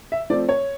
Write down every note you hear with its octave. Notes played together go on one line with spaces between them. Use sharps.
E5
F3 A3 C4 D5
C#5